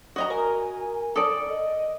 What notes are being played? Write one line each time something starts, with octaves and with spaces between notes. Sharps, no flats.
F#4 D#5 A#5 D#6
A#4 G#5
A4 D5 D6 D#6 D7
D#5